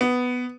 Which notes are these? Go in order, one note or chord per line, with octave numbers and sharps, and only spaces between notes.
B3